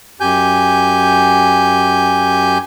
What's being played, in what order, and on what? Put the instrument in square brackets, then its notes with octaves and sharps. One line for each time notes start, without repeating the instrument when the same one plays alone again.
[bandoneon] F#2 G4 G#5 G6